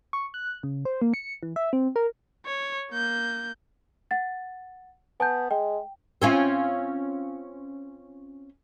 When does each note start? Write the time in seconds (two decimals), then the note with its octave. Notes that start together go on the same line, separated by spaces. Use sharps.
0.13 C#6
0.34 F#6
0.63 C#3
0.85 C5
1.02 A#3
1.14 C#7
1.43 E3
1.56 E5
1.73 C4
1.96 A#4
2.45 C#5
2.91 A#3 G6
4.11 F#5 A6
5.20 B3 G#5 A5 G6
5.51 G#3 G5
6.22 C4 C#4 F4